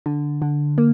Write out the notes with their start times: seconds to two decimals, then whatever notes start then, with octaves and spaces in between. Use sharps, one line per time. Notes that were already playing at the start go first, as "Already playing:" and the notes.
0.06 D3
0.42 D3
0.78 A#3